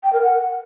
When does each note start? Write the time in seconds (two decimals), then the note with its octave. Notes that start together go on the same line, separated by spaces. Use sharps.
0.03 G5
0.13 A#4
0.22 F#5